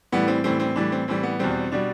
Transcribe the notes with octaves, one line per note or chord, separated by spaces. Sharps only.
A2 E3 G3 B3
C4
A2 E3 G3 C4
C4
A2 E3 G3 D4
C4
A2 E3 G3 C4
B3
E2 B2 G3 C4
B2 G3 D4